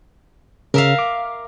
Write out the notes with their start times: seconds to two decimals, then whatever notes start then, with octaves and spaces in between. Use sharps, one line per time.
0.74 C#3 A#4 E5 F5
0.99 D6